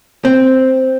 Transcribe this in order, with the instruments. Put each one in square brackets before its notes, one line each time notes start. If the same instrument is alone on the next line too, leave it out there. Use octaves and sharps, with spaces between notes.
[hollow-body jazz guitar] C4